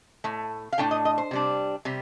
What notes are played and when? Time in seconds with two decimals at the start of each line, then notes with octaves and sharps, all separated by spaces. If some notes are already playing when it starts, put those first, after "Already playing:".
0.24 A2 A3
0.72 F5
0.78 A2 A3 D4 G5
0.91 D#5
1.05 D#5
1.18 C5
1.31 C3 G3 D4
1.85 C3 G3